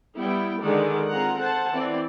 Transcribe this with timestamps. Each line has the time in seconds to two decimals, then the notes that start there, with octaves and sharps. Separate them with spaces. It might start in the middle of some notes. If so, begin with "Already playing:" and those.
0.17 G3 B3 E4 G5
0.60 D3 D#3 G#3 A4 D5 F#5
1.08 C4 F4 G#4 F#5 A#5
1.38 A4 C5 F#5 A5
1.73 E3 C4 D5